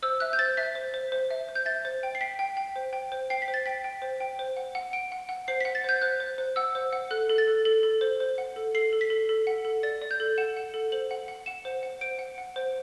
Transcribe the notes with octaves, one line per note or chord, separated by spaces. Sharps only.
C5 E6
E5 F#6
G6
C5 A6
E5 B6
C5
C5
C5
E5
C5
G6
E5 A6
C5
G5
C7
G5 B6
G5
G5
C5
G5
C5
G5 C7
B6
C5
A6
G5 B6
G5
C5
G5
C5
F#5
F#5
F#5 D7
F#5
F#5
C5 C7
B6
F#5
A6
C5 G6
C5 F#6
C5
C5
F#5 E6
C5
F#5
A4 F#6
A4
A6
A4
A4
A4
C5
C5
F#5
A4
A4 C7
A4
B6
A4
A4
F#5
A4
D5 A6
D5
G6
A4
F#5 E7
F#5
A4
C5 F#7
F#5
F#5
F#5 E7
C5
F#5
C5 D7
F#5
F#5
C5